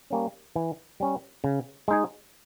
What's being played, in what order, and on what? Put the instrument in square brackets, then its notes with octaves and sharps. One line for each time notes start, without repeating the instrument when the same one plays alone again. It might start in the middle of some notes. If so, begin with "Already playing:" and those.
[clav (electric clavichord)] G3 A#3 C#4
E3
G3 C#4
C#3
G#3 D#4 G#4